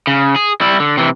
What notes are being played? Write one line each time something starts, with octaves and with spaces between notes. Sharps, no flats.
C#3
G#4
G3 E4
D3
C3 E3